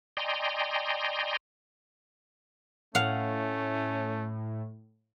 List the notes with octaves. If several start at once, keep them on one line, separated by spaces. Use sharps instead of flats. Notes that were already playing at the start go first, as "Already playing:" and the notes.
D5 D#5 G5 G#5 A#5 C6
A2 A3 C#4 F5 F#5